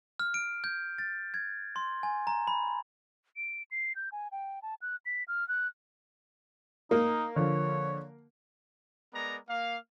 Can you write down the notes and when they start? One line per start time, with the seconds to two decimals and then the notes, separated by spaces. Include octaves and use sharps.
0.20 F6
0.34 D7
0.64 G6
0.98 A6
1.34 G#6
1.76 C6
2.03 G#5
2.27 A#5
2.47 B5
3.36 D7
3.71 C7
3.96 G6
4.12 G#5
4.32 G5
4.62 A5
4.82 F#6
5.06 B6
5.28 F6
5.48 F#6
6.91 A#3 D#4
7.36 D3 F3 C#5
9.13 G#3 B3 A#4 D5 A#5
9.48 A#3 F5